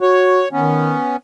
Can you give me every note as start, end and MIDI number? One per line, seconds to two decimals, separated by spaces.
0.01 0.42 66
0.01 0.49 73
0.52 0.96 51
0.52 1.16 59
0.52 1.16 61